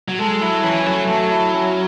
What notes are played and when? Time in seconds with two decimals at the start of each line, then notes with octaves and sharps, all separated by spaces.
0.08 F#3
0.19 G#3 A4
0.41 F#3 E4
0.63 E3 C#4
0.85 F#3 A3
1.08 F#3 A4
1.30 E4
1.53 C#4